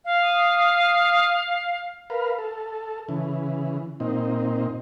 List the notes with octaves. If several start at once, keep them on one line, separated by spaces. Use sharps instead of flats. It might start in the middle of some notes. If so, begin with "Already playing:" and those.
F5
D#6
A#4 B4 F5
A4
C#3 E3
A#2 C4 D#4